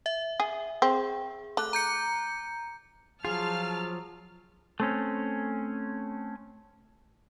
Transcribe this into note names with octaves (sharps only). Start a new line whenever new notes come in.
E5
G#4
C4 G#4
A3 D6 F#6
A#5 G6 C#7
F3 F#3 F4 G#4 A5 F6
A3 C4 C#4